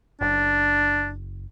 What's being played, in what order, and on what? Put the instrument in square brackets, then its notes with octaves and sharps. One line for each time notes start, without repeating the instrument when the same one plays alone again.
[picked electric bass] F#1 [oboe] D4